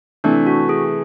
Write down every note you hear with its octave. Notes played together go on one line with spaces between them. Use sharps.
C3 E3 A3 D4
F#4
G#4